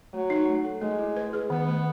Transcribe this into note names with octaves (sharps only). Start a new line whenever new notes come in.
F#3 A3
D#4
A3
A4
G#3 A3
E4
B4
G#4
D#3 B3
A3